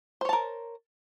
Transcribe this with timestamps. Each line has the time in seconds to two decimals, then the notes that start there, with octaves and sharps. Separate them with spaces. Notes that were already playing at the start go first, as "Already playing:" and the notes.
0.21 C5
0.25 C#5
0.29 A5
0.33 A#4